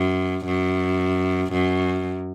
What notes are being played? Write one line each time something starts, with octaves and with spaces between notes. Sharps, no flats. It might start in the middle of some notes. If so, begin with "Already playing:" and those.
Already playing: F#2
F#2
F#2